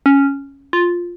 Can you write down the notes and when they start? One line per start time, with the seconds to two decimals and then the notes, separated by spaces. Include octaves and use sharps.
0.06 C#4
0.73 F4